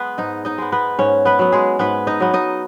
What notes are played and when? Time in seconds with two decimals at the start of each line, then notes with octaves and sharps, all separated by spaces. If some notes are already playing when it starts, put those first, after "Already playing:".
Already playing: G#3 B3 G#4 B4
0.18 G#2 D#4 D#5
0.45 D#4 D#5
0.58 G#3 B3
0.72 B3 B4
0.99 G#2 C#4 C#5
1.25 B3 B4
1.39 F#3 B3
1.52 G#3 G#4
1.79 G#2 B3 B4
2.07 D#4 D#5
2.20 F#3 B3
2.34 D#4 D#5